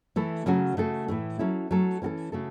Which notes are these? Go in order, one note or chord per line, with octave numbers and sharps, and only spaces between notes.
E3 A3 E4 A4
C#3 F#3 A3 C#4 F#4
C#3 A3 F#4 A4
A2 E3 A3
F#3 C#4 E4 A4
F#3 A3 C#4 A4
E3 C#4 F#4 A4
C#3 A3 F#4 A4